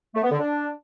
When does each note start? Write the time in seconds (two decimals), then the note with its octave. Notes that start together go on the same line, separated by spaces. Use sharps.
0.15 A3
0.23 B3
0.31 D3
0.39 D4